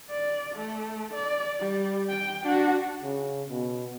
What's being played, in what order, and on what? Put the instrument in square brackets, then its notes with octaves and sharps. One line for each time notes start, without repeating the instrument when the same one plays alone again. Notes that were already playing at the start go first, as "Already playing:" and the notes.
[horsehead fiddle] D5
A3
D5
G3
G5
D4 F#4
[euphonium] C#3
B2